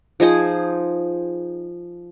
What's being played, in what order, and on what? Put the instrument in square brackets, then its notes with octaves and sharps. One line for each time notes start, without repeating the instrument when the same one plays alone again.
[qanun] F3 D#4 G#4 C5